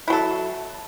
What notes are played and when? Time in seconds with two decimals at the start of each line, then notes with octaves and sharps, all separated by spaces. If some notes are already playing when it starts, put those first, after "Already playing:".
0.08 E4
0.10 F#3
0.13 A4